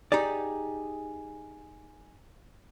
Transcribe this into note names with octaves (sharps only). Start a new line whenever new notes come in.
D#4 G4 G#4 D5